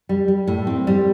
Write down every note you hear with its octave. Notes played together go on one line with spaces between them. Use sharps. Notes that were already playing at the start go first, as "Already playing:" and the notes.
G3
G3
A2
C4
G3